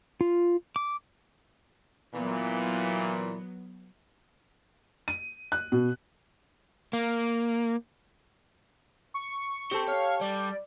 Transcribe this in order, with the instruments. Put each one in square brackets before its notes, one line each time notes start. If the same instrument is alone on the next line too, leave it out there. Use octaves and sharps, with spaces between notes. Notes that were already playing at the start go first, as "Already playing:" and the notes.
[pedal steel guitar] F4
D6
[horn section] A#2 E3 [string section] F#3 B3
[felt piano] D#7
F#6
B2
[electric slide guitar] A#3
[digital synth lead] C#6
[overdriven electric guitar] C4 [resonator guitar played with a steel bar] G4 A4
[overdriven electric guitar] C#5 [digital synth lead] F5
[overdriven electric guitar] G3 [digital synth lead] D5